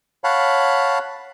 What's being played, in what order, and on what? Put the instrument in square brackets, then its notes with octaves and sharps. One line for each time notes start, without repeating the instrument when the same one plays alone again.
[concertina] C#5 F5 F#5 A5 B5